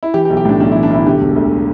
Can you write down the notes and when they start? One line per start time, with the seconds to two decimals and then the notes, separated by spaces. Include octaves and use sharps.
0.03 E4
0.14 E3 G4
0.25 G4
0.30 B1
0.37 G4
0.45 A2 D4
0.60 B1 D4
0.72 E4
0.75 E3
0.83 D4
0.90 B1 E4
1.06 D3 G4
1.21 E1
1.36 D2